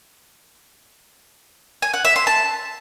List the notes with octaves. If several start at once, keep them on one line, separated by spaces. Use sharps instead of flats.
G#5
F#5
E5
C6
A5